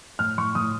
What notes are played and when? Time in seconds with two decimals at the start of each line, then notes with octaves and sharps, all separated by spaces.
0.19 A2 F6
0.38 A2 C#6
0.55 A2 D#6